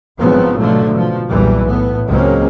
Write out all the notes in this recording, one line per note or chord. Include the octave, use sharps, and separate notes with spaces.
G#1 C#3 F3 F#3 B3 C4
B2 D3 F3 F#3 A3
B2 F3
B1 E2 A#2 E3 G3
A2 B3
C#2 F#3 G#3 A#3 C4 C#4